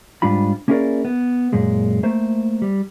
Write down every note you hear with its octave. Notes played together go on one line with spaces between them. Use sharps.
G#2 G3 D4 F4 B5
A#3 C#4 E4 G#4 A#4 D5
B3
F#2 A#2 G#3
A3 A#3 C5
G3